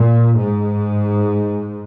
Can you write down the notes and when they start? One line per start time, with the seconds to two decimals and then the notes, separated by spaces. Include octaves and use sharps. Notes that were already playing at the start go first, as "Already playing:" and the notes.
Already playing: A#2
0.38 G#2